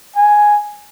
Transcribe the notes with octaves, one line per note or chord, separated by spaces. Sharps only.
G#5